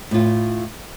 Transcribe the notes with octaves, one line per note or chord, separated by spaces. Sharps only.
A2 F4